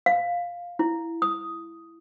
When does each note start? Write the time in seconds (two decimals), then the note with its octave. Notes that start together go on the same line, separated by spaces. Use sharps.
0.06 F5
0.79 E4
1.22 D#6